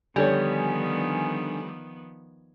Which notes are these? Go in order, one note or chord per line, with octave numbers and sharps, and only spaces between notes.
D3 D#3 F3 G3 B3 D4 C#5 G#5